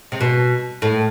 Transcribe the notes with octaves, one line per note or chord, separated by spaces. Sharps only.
C3
B2
A2